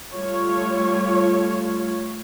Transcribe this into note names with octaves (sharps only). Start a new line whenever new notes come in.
G3 A3 F4 C#5